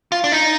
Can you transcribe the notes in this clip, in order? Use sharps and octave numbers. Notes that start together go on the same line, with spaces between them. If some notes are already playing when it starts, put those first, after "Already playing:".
F4
D4
D#4